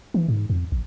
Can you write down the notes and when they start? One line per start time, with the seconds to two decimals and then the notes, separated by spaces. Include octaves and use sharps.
0.14 E3
0.28 G#2
0.50 F2
0.72 A#1